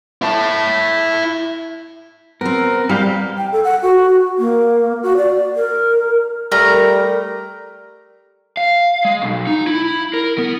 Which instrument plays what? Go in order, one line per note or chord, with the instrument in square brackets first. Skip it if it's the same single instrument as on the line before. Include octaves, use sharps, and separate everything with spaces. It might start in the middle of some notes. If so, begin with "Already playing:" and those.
[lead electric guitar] E4 A5
[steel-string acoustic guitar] B3 C4 [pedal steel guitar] A#4
[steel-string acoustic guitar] G3 G4 [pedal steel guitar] E4 F5 G6
[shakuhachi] G5
A4
F#5
F#4
A#3
F#4
D5
A#4
[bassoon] G3 [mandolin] A3 A#5 [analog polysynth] A#4 [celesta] F6
[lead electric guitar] F5
G#3
B1
D#4
E4
A#4
B3